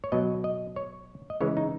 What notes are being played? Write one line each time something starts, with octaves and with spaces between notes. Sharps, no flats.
C#5
B2 F#3 D#5
D#5
C#5
D#5
C#3 E3 G#3 C#5
D#4